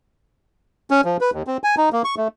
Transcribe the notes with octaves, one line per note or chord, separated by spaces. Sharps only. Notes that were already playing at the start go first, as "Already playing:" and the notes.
C#4
F3
B4
D#2
C4
G#5
D#4
A#3
C#6
A3